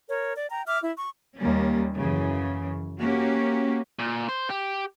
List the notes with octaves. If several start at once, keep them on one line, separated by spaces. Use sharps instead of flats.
A#4 C#5
D5
G5 A#5
E5 D6 F6
E4
C#6
D#2 G3 A#3 C#4
F#2 C#3 E3
A#3 C#4 F#4 G4
A#2
C5
G4